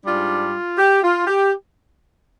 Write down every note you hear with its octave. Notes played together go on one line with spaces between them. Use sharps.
G#2 G3 D4 F4
G4
F4
G4